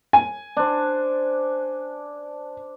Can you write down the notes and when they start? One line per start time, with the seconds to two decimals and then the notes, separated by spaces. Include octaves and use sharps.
0.13 G#5
0.57 D4 C5